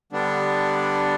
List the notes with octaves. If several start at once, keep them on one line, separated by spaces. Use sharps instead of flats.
D3 G3 B3 D4